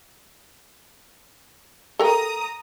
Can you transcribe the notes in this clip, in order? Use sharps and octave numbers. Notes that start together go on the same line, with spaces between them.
A4 A#4 G5 A#5 D#6